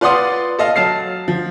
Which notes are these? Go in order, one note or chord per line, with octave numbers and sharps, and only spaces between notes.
F4 B4 D5 F#5 C6 D#6
A4 D#5 F5
F#3 A5 F6 C7
F3